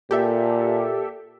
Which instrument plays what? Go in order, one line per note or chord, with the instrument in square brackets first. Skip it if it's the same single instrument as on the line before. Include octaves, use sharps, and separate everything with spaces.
[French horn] A#2 [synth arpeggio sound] G4 A4 E5